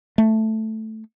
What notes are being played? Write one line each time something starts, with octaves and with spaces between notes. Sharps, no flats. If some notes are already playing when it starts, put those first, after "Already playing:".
A3